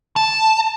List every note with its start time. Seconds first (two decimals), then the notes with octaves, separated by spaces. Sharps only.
0.16 A5